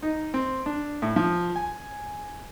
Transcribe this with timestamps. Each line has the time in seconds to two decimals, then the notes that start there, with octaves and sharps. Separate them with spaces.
0.02 D#4
0.34 C4
0.66 D4
1.02 A2
1.16 F3
1.56 G#5